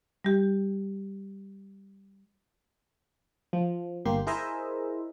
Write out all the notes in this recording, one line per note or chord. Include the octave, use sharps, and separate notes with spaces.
G3 G4
F3
G1 A#3 G4 C6
E4 G#4 A#4 C5 D#5 E5